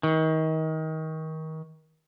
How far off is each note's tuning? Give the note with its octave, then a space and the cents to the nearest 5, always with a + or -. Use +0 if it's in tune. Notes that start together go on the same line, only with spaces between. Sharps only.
D#3 +30